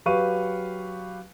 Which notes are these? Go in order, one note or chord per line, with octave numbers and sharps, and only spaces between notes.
F#3 G4 B4 F5 C#6 D#7